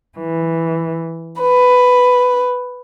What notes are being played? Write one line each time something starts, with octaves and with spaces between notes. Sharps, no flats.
E3
B4